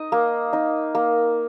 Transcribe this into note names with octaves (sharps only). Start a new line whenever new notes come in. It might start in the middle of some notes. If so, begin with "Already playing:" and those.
Already playing: D#4 D#5
A#3
D#4
A#3